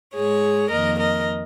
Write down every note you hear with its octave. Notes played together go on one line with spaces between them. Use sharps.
G#2 G#3 G#4 C#5
F2 D#3 A#3 A#4 D#5
A#4 D#5